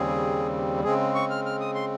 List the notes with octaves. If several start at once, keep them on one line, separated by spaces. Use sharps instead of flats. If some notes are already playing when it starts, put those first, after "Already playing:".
Already playing: D#2 C#3 G3 C4 G#4
C#3 G#3 C4 G#4
C#6
F6
F6
D#6
C6